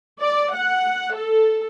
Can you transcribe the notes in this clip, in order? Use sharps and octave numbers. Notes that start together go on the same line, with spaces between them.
D5
F#5
A4